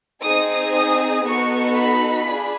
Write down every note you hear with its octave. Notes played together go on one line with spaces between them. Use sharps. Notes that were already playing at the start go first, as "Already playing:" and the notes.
C4 D#4 G#4 D#6
D#6
B3 D#4 F#4 A4 C#6
B5
D4 F4 G#4